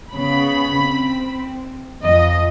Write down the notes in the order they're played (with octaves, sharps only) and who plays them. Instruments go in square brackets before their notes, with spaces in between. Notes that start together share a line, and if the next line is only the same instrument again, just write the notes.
[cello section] C#3 B3 [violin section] B5
[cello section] C4
[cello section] F2 [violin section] D#5